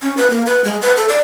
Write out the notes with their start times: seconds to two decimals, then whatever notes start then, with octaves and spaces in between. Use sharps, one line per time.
0.02 C#4
0.17 B4
0.30 A#3
0.46 B4
0.64 G#3
0.82 B4
0.97 A4
1.09 D5